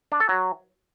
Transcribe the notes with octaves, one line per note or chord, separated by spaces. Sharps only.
D4
A4
F#3